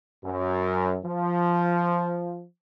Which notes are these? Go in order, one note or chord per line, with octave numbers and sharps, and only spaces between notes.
F#2
F3